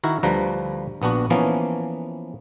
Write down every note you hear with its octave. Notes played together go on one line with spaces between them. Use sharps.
D#3 E4 F#4 A#4
D2 F3 G3 B4 A#5
A#1 B3 D4 F#4
E3 F3 A#3 B3 C#4